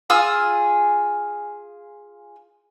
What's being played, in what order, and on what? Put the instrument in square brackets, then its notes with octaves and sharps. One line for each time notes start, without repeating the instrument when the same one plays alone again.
[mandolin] F4 G#4 E6